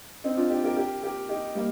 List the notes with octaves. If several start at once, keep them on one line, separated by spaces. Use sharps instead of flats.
C4 D#4
D4 F4
D#4 G4
G4 A#4
G4 A#4
G4 A#4
D#4 G4
G3 A#3